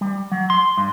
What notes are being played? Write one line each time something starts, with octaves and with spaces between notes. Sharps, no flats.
G3
F#3
C6
G2